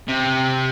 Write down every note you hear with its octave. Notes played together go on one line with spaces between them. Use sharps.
C3